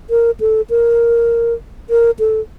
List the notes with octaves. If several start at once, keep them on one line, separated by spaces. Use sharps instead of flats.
A#4
A4
A#4
A#4
A4